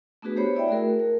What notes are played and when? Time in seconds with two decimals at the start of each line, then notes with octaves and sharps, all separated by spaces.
0.22 A3 B3 D4 F#4 G#4 B4
0.36 G4 C5 C#5 B5
0.55 E4 D5 E5 G5
0.68 A3 F#4 G#4 A#4
0.99 A#4